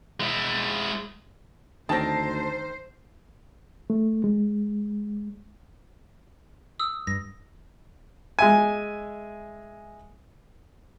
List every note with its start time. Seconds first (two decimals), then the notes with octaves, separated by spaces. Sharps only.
0.20 G#3 E4
1.89 D2 D#3 C4 C5 A5 A#6
3.90 A3
4.24 G#3
6.80 D#6 E6
7.07 G2 A#6
8.39 G#3 E5 G#5